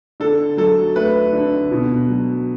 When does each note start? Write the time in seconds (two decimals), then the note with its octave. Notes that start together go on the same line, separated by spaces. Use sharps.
0.20 D3 A4
0.57 F#3 A4
0.96 A3 B4
1.33 D3
1.71 B2
2.08 F#3